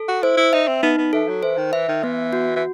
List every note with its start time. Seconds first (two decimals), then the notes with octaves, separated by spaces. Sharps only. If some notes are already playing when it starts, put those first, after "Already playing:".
Already playing: A4
0.08 F#4
0.23 E4 C5
0.37 E4
0.53 D#4 E5
0.68 C4
0.83 B3 D#4
0.98 B3
1.13 E3 A4
1.29 F#3
1.43 E3 C5
1.58 D#3
1.73 E3 E5
1.88 D#3
2.03 E3 B3
2.33 F#4
2.56 E3